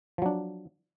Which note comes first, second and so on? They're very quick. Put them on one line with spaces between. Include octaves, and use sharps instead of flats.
F3 F#3 D4